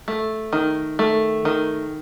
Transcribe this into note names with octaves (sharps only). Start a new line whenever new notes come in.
A3
D#3
A3
D#3